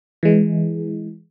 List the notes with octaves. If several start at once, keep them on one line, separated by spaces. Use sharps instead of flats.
E3 G#3